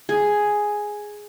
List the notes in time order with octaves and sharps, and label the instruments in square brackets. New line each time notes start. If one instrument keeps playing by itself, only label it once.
[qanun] G#4